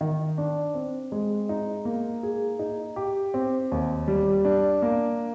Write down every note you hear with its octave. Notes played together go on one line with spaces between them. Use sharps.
D#3
D4
C4
G#3
D#4
A#3
G#4
D#4
G4
C4
D#2
G3
D4
A#3